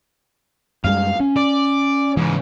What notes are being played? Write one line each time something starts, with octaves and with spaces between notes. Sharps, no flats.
F#2 G3 G#3 F5
C#4
D5
G#2 C#3 E3